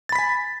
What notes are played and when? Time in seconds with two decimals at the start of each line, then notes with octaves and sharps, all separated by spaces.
0.09 A6
0.12 B5
0.15 B6
0.19 G#5